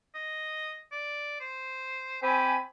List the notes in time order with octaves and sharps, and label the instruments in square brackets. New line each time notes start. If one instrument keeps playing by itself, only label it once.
[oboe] D#5
D5
C5
[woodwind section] C4 G#5 B5 [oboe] G4